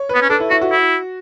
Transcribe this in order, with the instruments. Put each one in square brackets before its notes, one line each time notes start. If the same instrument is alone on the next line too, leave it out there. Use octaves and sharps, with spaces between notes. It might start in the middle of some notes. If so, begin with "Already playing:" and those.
Already playing: [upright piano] C#5
B4
[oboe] B3
C#4
[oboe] D4 [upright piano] A4
[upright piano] E4
[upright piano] E4 [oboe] F#4
[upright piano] F#4
[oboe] E4